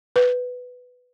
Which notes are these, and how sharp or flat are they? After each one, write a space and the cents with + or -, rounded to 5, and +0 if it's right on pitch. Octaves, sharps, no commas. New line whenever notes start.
B4 +10